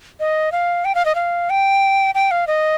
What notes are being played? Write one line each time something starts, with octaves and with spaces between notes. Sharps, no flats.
D#5
F5
G5
F5
D#5
F5
G5
G5
F5
D#5